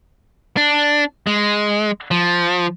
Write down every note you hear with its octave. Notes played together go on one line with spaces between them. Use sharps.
D4
G#3
F3